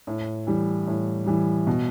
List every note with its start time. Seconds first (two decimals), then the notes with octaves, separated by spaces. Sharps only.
0.07 A2
0.47 E3 G3
0.87 A2
1.26 E3 G3
1.67 B2